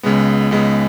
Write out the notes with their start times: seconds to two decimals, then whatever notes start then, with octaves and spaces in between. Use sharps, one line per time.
0.03 C#2 C#3 G#3 B3
0.51 C#2 C#3 G#3 B3